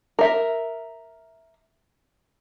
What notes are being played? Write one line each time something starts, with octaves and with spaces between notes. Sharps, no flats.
A#4 E5